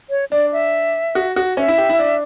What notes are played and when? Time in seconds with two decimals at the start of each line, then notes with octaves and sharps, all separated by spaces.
0.10 C#5
0.31 D4 D5
0.53 E5
1.15 F#4
1.36 F#4
1.57 C#4 E5
1.68 E4
1.78 G4
1.89 E4
1.99 D4